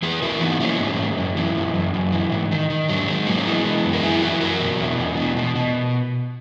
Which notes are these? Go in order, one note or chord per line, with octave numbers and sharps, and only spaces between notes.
E3 G#4 B4
E3 F#4 A#4
E3 B3 D#4
E3 A#3 C#4
G#2
G#2
F#2
E3
F#2
F#2
F#2
E3
G#2
D#3
D#3
G#2 F#3
D#3 G#3
G#2 F#3 A#3
C#4
E3 G#3 B3
E3
F#2
A#4
F#2 E4 G#4
E3 F#4 A#4
F#2 F#4 A#4
B2
E2
E2
B2
B2
B2